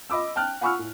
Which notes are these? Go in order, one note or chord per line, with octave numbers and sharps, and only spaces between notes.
D#5 B5 D6 E6
G5 A5 F6 F#6
F#5 G#5 B5 C#6 E6 F6
A2